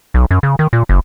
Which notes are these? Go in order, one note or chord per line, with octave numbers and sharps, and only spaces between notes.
B1
F#2
C#3
D#3
A#2
F#1